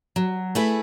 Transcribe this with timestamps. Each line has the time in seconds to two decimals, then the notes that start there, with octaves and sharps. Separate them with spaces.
0.16 F#3
0.55 A3 E4 G#4 B4